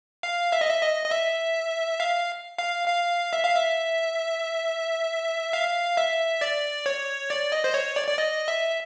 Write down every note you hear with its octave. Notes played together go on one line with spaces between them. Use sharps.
F5
E5
D#5
E5
D#5
D#5
E5
F5
F5
F5
E5
F5
E5
F5
E5
D5
C#5
D5
D#5
C5
C#5
D5
D5
D#5
E5